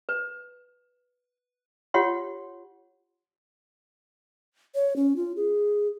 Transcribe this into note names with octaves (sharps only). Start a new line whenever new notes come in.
B4
F4 G4 C#5 F#5 C6
C#5
C#4
F4
G#4